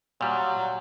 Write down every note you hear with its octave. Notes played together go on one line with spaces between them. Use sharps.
A#2 F#3 G3